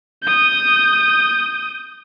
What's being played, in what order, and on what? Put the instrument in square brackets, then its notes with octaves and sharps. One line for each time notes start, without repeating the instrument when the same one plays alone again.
[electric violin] D#6 G6